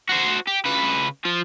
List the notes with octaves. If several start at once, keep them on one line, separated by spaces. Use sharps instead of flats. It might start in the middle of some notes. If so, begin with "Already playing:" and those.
F#4 C5
G4
C#3 B4
F3 F4